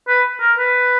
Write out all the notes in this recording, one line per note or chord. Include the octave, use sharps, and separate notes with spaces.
B4
A#4
B4